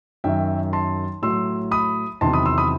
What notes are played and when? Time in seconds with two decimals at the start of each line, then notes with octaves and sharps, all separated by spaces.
0.24 F#2 D#3 F#3 E5 G5
0.73 A5 C6
1.22 A2 F#3 C6 E6
1.71 B5 D#6
2.21 E2 C3 D#3 F#3 A5 C6
2.33 B5 D#6
2.45 C6 E6
2.58 B5 D#6